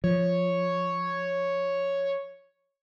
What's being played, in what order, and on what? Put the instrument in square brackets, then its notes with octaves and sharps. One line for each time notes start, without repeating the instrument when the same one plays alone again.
[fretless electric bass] F3 [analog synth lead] C#5